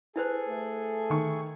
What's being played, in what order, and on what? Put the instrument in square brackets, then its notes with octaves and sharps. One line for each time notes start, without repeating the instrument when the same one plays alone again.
[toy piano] E4 B4 C5 [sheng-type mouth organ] G#4 A4 G#5
[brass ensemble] A3
[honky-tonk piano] D#3 C#6